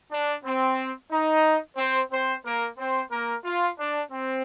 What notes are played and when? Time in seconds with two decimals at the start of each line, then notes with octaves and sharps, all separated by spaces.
0.11 D4
0.45 C4
1.11 D#4
1.77 C4 C5
2.11 C4 C5
2.45 A#3 A#4
2.78 C4 C5
3.11 A#3 A#4
3.44 F4
3.78 D4
4.11 C4